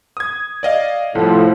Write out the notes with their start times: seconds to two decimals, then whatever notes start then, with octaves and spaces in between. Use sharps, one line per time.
0.17 D#6 G#6
0.63 D5 D#5 F5
1.15 C2 A2 F3